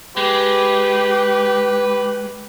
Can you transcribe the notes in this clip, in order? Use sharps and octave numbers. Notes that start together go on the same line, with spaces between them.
G#3 G4 B4